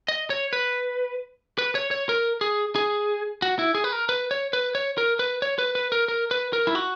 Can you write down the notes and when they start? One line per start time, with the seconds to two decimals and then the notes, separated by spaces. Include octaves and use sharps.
0.08 D#5
0.30 C#5
0.53 B4
1.58 B4
1.75 C#5
1.91 C#5
2.09 A#4
2.41 G#4
2.76 G#4
3.42 F#4
3.59 E4
3.75 G#4
3.84 B4
3.92 A#4
4.09 B4
4.31 C#5
4.53 B4
4.75 C#5
4.98 A#4
5.19 B4
5.42 C#5
5.58 B4
5.75 B4
5.92 A#4
6.08 A#4
6.31 B4
6.53 A#4
6.67 E4
6.75 F#4